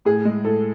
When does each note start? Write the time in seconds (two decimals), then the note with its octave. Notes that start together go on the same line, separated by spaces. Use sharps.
0.05 A2 G#4
0.25 G#3
0.45 A2 A4